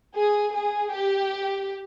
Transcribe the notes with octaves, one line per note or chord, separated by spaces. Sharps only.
G#4
G#4
G4